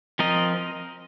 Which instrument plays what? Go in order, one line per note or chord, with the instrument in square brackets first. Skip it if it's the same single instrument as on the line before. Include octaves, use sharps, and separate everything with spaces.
[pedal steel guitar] F3 C4 A#4 D#5